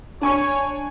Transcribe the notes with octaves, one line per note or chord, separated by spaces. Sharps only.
D4 C#5 G#5 C#6